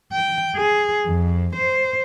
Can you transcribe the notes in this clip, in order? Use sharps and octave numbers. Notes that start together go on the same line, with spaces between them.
G5
G#4
F2
C5